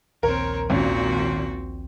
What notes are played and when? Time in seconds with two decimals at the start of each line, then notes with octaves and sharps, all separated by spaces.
0.23 A#1 D#2 C4 A#4 C#5
0.70 G#1 A#2 C4 C#4 F#4